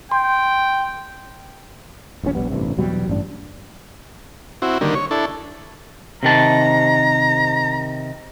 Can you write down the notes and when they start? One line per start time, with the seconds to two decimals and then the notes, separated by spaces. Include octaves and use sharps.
0.11 G5 C6
2.23 D#1 A#1 G#2 C#4
2.35 A#1 G#2 G3 B3
2.50 A1 G2 C3
2.77 E2 B2 F#3 G3
3.08 A1 G2 D4
4.62 C4 E4 F#4
4.81 D3 D#3 G3 A#3
4.95 C#5
5.11 D4 E4 A4
6.23 C3 D#3 A5 A#5